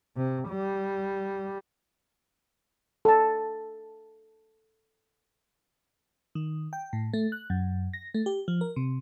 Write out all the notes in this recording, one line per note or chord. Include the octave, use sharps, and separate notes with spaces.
C3
G3
A4 A5
D#3
G5
A2
A3
F#6
F#2
A#6
A3
G4
F3
A#4
C3